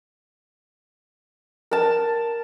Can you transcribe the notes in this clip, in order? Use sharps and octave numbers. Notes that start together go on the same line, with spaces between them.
A#4 A5